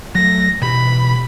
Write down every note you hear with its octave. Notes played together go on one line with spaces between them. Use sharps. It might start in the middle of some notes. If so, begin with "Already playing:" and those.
F#3 A3 A#6
B2 E3 G4 B5